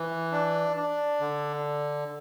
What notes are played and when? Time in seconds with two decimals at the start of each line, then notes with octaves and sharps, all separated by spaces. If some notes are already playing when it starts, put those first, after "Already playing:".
Already playing: E3
0.32 D4
0.77 D4
1.21 D3